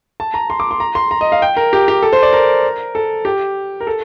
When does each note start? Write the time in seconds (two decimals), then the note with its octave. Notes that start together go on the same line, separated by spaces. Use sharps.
0.20 A5
0.34 A#5
0.50 C6
0.60 D6
0.71 C6
0.80 A#5
0.95 C6
1.11 A#5
1.21 D#5
1.32 F5
1.42 G5
1.57 A#4
1.73 G4
1.88 G4
2.03 A4
2.13 C5
2.23 D5
2.33 A#4
2.95 A4
3.25 G4
3.80 A#4
3.87 A4